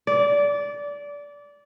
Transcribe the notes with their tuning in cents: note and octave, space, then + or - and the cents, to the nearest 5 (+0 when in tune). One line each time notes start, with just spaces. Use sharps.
D5 -20